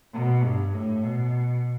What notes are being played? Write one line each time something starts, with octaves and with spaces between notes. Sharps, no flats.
B2
G2
A2
B2